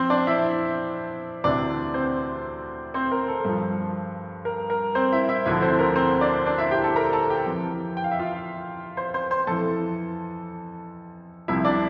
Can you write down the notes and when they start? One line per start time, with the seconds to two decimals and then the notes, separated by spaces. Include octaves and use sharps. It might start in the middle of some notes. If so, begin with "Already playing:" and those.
Already playing: F2 E3 C4 C5
0.10 D4 D5
0.27 E4 E5
1.44 D2 C3 E3 D4 D5
1.94 C4 C5
2.94 C4 C5
3.11 A#4
3.28 A4
3.45 G2 F3
4.45 A#4
4.70 A#4
4.95 C4 C5
5.12 E4 E5
5.29 E4 E5
5.46 D2 D3 F3 E4 E5
5.62 C4 C5
5.79 A#4
5.95 C4 C5
6.21 D4 D5
6.46 D4 D5
6.58 E4 E5
6.71 G4 G5
6.84 A4 A5
6.96 A#4 A#5
7.13 A4 A5
7.30 G4 G5
7.46 F2 E3
7.97 G5
8.04 F5
8.11 E5
8.19 F4 F5
8.97 C5 C6
9.14 C5 C6
9.31 C5 C6
9.47 F2 E3 A4 A5
11.48 C2 C3 F3 E4 E5
11.65 D4 D5